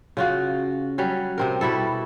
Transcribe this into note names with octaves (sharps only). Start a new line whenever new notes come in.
C#3 F4 F#4
F#3 G3 C#4
C3 C4 A#4
B2 G3 E4 A4